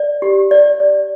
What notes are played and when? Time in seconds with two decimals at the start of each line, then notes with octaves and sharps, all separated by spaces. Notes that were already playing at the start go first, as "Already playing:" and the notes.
Already playing: D5
0.22 G4
0.51 D5
0.80 D5